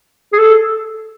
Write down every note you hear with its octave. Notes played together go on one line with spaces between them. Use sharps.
G#4
A4